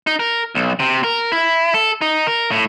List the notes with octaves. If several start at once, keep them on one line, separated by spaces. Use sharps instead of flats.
D#4
A#4
B1
C3
A#4
E4
A4
D#4
A#4
A2